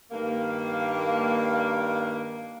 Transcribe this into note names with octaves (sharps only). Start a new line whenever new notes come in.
G2 D#3 A#3